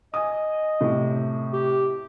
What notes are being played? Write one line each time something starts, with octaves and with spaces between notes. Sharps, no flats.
D#5 G#5 D#6
A2 C3
G4